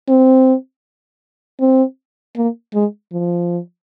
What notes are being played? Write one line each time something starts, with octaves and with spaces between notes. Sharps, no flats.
C4
C4
A#3
G#3
F3